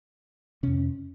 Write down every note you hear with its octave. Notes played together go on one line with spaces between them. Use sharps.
F2 C3 C#4